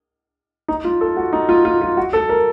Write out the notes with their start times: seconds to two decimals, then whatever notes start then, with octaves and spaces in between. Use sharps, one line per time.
0.68 D#4
0.84 F4
1.01 A4
1.17 F#4
1.33 D#4
1.49 F4
1.65 F4
1.81 F4
1.97 F#4
2.13 A4
2.29 A#4